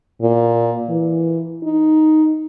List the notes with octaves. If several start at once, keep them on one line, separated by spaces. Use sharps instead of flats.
A#2
E3
D#4